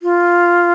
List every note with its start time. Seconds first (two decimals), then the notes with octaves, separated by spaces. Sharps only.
0.03 F4